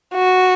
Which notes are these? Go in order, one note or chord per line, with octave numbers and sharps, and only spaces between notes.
F#4